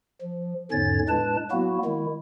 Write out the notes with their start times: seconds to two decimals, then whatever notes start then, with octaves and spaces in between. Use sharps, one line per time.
0.22 F3
0.72 E2 G#2 D3 C#4 C#5 A6
1.09 A2 G#3 D4 B4 A5
1.51 F#3 A#3 B3 E4 F#4
1.85 D#3 G#3 E4